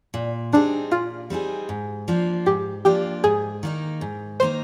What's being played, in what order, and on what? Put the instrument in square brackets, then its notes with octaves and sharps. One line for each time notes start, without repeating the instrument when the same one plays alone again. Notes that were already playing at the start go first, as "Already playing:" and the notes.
[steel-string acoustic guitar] A#2
[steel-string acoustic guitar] G3 C4 D#4 G#4 [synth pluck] D4
[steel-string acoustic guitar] A#2 [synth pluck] F4
[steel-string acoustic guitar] G3 C4 D#4 G#4
G#2
F3 A#3 D4 F4
[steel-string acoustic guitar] G#2 [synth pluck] G4
[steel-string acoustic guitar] F3 A#3 D4 F4 [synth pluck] G4
[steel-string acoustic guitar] G#2 [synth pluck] G#4
[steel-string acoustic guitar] D#3 A#3 D#4
G#2
[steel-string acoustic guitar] D#3 A#3 D#4 [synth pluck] C5